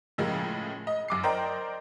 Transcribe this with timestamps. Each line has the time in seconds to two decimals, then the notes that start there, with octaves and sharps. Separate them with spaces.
0.18 A2 C#3 F3 G#3 A#3
0.87 D#5
1.08 F#2 D6 C7
1.23 A#4 C5 D5 D#5 G5 A#5